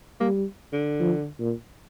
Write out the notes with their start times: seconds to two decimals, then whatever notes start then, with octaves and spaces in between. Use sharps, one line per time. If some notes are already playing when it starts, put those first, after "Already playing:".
0.20 G3 A#3
0.73 D3
1.00 F3
1.40 A#2